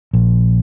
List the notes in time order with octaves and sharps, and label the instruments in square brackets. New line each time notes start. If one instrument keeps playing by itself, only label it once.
[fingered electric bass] A#1